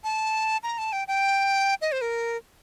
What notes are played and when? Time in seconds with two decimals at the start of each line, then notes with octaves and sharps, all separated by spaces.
0.04 A5
0.63 A#5
0.78 A5
0.93 G5
1.08 G5
1.82 D#5
1.92 C5
2.01 A#4